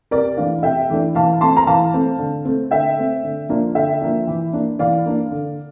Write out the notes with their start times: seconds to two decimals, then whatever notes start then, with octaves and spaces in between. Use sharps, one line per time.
0.11 C3 A#4 D5
0.37 E3 A3 D4 D5 F5
0.63 C3 E5 G5
0.90 E3 A3 D4
1.15 E3 F5 A5
1.41 A3 C4 A5 C6
1.57 A#5
1.67 E3 F5 A5
1.94 A3 C4
2.19 D3
2.45 A3 C4
2.71 D3 E5 G5
2.97 A3 C4
3.23 D3
3.49 F3 A#3 D4
3.75 D3 E5 G5
4.01 F3 A#3 D4
4.27 E3
4.53 A#3 D4
4.79 E3 D5 F5
5.06 A#3 D4
5.31 D3